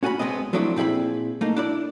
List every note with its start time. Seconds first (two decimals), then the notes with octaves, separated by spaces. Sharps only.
0.03 C#4 F#4 G#5 A5 B5
0.19 B1 G#3 B3 C4 D#5
0.53 F3 F#3 A3 C4 D4 E4
0.76 A#2 C4 E4 G#4 B5
1.41 A3 A#3 D#4
1.56 D4 E4 D5